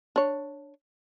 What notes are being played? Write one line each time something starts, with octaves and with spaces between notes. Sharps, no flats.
D4 C#5